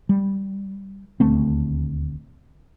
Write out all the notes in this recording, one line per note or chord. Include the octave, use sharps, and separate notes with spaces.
G3
D#1 D2 A3 C4